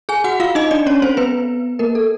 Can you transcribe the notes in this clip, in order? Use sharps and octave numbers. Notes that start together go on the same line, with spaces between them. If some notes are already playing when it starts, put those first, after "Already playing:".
G#4 G#5
F#4 F#5
F4 F5
D#4 D#5
D4 D5
C#4 C#5
C4 C5
B3 B4
A#3 A#4
A4